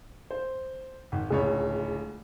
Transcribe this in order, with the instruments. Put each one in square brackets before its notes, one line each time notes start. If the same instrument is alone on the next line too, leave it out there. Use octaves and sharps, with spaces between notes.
[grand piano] C5
G#1
[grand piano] D1 C#2 C#5 [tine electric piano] G#4